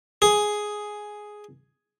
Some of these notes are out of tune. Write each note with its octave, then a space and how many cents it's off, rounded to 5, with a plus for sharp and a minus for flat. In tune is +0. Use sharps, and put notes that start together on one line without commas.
G#4 +5